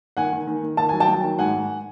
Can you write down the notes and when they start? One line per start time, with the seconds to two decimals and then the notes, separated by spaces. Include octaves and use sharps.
0.17 D#3 F#5 G#5
0.33 D#3
0.47 D#3
0.63 D#3
0.77 D#3 A5
0.89 F#3 G#5
1.00 G5 A5
1.08 F#3
1.24 D#3
1.39 G#2 F#5 G#5
1.54 G#2